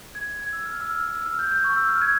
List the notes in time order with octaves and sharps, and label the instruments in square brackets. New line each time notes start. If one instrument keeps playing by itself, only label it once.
[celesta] G#6
G#6
E6
F6
E6
F6
E6
F6
G6
G6
C#6
E6
F6
G#6